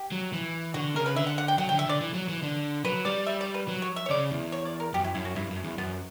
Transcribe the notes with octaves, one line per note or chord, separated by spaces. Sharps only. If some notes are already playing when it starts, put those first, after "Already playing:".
Already playing: G4
F#3
E3
D3 F#4
C#3 A#4
B4
D3 E5
F#5
F#5
G5
F#3 F#5
G5
D3
E5
D3 D5
E3
F#3
E3
D3
F#3 B4
G3 D5
E5
D5
B4
F#3
C#5
E5
C#5
C#3 D5
E2
C#5
D5
A#4
F#2 G4
E4
F#2 E4
F#4
G2 E4
F#2
C#4
E2
F#2 B3